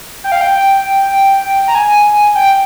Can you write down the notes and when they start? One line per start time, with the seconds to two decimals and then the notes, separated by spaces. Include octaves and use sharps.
0.24 G5
0.32 F5
0.41 G5
1.68 A#5
1.75 G#5
2.35 G5